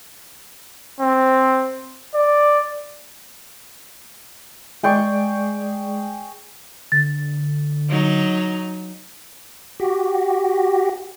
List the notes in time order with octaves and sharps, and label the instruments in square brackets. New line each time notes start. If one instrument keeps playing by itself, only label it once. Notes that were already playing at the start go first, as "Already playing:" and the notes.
[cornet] C4
D5
[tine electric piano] G#3 D5 [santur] G#4 G5 C#6
[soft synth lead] D3 [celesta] A6
[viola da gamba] F#3 D#4
[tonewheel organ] F#4 G4